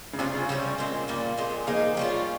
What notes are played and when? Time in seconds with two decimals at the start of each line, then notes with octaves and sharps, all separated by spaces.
0.13 C#3
0.19 C3 G3 C#4 F4 G#4
0.34 C#3
0.49 C3 G3 C#4
0.78 A#2 G#3 C4
1.08 A#2 G3 A#3
1.38 A#2 G#3 C4
1.67 F3 G#3 A#3 D#4
1.97 G3 C#4 F4